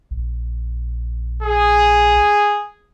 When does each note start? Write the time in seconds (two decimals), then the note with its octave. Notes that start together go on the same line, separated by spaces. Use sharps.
0.11 A#1
1.43 G#4